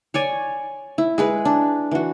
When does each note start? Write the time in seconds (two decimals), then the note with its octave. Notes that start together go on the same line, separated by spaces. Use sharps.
0.14 C#5 D5 G#5
0.98 E4
1.18 G#3 G#4 B4
1.45 D4
1.91 E3 F#4